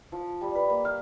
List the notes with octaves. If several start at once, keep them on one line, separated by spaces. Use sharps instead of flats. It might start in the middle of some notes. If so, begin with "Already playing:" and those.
F3
G3
B4
A#3
F5